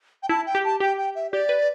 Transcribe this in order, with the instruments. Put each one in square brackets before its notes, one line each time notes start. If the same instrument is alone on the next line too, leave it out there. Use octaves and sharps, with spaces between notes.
[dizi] G5
[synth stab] E4 [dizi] A5
[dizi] G5
[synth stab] G4
[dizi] A5
[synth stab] G4 [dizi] G5
[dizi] G5
E5
[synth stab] G4 [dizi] D5
[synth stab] B4